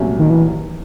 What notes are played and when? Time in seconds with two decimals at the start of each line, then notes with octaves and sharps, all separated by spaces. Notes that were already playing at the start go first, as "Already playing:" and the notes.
Already playing: C2 A#2 F#3 A3 C#4
0.19 D#3
0.30 E3